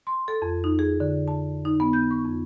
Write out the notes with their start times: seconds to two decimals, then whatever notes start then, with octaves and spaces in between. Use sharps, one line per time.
0.07 C6
0.28 A4
0.42 F2
0.64 D#4
0.79 G#4
1.00 D3
1.28 A5
1.65 D#4
1.80 B3
1.93 G6
2.11 C#6
2.25 F2